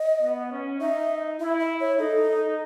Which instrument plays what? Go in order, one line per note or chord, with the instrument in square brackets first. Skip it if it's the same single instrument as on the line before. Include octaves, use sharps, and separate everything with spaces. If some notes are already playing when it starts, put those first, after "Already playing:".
Already playing: [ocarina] D#5
[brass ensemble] B3
C#4
[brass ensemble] D#4 [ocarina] E5
[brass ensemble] E4 [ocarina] E5
[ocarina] E5
C#5
[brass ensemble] D#4 [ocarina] A4
[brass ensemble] D#4